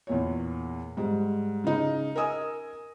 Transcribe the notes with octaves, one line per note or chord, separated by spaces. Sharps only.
E2 A#2 C#5
G#2 G3
C#3 D#4
A#4 D#5 G#5 D#6 E6